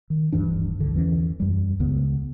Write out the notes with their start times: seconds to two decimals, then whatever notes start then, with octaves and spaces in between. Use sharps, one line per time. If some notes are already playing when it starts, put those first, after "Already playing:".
0.10 D#3
0.32 D1 G2 E3 D4
0.80 C2 D3
0.94 E2 E3 C#4
1.40 F#2 G3
1.79 C#2 C#3 B3